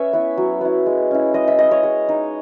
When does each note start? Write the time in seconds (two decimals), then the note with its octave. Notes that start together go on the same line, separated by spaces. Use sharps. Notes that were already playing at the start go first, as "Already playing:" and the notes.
Already playing: C#4 B4 C#5 E5
0.13 B3 E4
0.37 F#3
0.61 B3 E4
0.86 G#3
1.11 C#4 E4
1.34 G#3 D#5
1.48 E5
1.59 C#4 E4 D#5
1.71 C#5
1.83 G#3 C#5
2.09 D#4